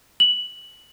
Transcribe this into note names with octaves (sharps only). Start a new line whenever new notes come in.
F#7